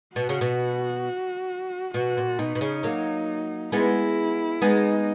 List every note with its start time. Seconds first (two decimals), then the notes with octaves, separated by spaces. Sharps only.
0.16 B2 F#4
0.29 C#3
0.41 B2
1.94 B2 F#4
2.17 A#2
2.39 B2 D#4
2.55 B2
2.61 C#3
2.83 F#3 A#3
3.72 G#3 B3 E4
4.62 G#3 B3 D#4